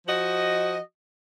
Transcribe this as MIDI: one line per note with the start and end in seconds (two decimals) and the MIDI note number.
0.08 0.78 53
0.08 0.78 66
0.08 0.78 75